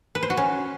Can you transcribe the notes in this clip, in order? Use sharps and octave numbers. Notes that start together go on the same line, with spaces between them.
B4
C5
F#4
C#4